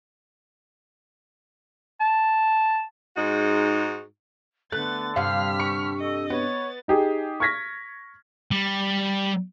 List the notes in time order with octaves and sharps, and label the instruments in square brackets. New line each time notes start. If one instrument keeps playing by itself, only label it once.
[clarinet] A5
[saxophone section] G#2 G#3 D#4 F#4
[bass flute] D3 [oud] A3 [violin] B3 A6 [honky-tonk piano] F#6
[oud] G2 C3 [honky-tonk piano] F5 [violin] F6 B6
[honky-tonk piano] C#6 C#7
[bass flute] A4 [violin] D#5
[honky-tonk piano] B3 [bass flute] C#5 [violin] A6
[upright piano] D#4 G4 G#4
C#6 F6 G#6 A#6 B6
[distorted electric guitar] G3